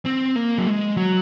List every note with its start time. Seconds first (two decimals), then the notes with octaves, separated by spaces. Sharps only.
0.05 C4
0.35 A#3
0.58 F#3
0.67 G#3
0.97 F#3